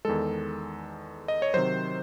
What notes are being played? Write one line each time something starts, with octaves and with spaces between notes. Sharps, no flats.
E2 D#3 G#3 A4
D#5
C#5
C3 D#3 F#3 C5